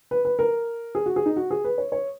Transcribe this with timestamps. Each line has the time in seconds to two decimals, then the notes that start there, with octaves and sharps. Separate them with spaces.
0.11 B4
0.25 B4
0.39 A#4
0.95 G#4
1.06 F#4
1.16 G#4
1.26 D#4
1.36 F#4
1.50 G#4
1.64 B4
1.78 C#5
1.92 C#5